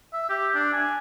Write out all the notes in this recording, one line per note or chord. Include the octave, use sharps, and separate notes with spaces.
E5
G4
D4
G#5